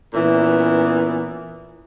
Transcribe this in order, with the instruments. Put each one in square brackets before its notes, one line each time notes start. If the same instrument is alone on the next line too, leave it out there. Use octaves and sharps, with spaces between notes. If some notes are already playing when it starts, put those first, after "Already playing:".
[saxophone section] A#2 E3 B3 C#4